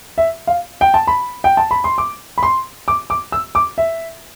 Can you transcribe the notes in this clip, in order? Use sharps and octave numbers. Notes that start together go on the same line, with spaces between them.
E5
F5
G5
A5
B5
G5
A5
B5
C6
D6
B5
C6
D6
D6
E6
D6
E5